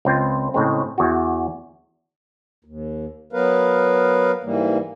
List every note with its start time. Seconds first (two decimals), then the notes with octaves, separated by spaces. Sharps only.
0.05 C#2 C4 F4 G5
0.54 A2 C#3 G#3 C4
0.98 E2 F#4
2.64 D#2
3.33 F#3 B3 A#4 B4 F5
4.43 G#2 E3 G3 A#3